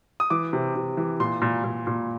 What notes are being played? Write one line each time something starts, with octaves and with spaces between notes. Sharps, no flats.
D#6
E3 D6
C3
C3
E3
A#2 C6
A#2
A#2
A#2